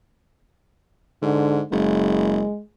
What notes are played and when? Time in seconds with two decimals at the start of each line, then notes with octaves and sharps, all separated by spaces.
1.22 G#2 D3
1.72 F#1 G#3